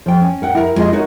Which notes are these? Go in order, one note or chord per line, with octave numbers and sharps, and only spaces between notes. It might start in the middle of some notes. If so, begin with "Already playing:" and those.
F3 G5
C#4
A#4 F#5 G5
E4 A#4
G#3 F4 G#4 D#5
D#4 F#4 A#4 C#5